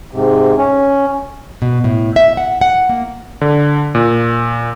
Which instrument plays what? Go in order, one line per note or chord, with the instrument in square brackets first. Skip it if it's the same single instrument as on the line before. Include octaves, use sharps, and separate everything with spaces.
[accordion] G#2 C3
C#4
[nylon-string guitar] B2
A2
E5
F#5
F#5
A#3
[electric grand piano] D3
A#2